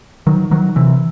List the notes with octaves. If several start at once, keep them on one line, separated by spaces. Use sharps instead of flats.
D#3 F#3
D#3 F#3
C3 E3